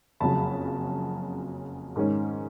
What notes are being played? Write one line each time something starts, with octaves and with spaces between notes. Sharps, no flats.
F#1 F2 C#3 F#3 A5 B5
G#2 D#3 G#3 C#4